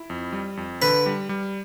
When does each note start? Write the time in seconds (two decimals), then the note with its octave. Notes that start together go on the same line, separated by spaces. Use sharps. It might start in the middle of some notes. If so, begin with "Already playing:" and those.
Already playing: E4
0.10 F2
0.33 G3
0.57 F2
0.81 D3 B4
1.06 G3
1.29 G3